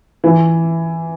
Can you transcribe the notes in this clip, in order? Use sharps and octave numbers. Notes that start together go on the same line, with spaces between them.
E3